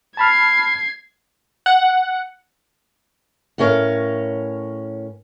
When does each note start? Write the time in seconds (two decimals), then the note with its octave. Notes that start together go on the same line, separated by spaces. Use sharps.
0.17 A5 B5 F6 G#6 C7
1.66 F#5
3.58 A2 A3 C#4 A#4 C#5 F5